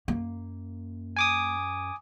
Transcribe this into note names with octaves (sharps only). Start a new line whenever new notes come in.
F#2 A#3
G#5 D6 D#6